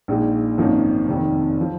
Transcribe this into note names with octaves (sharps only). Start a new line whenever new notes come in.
A#1 A#2 G#3 D#4
G#1 F#2 F3 A#3 D#4
F1 F2 D#3
F3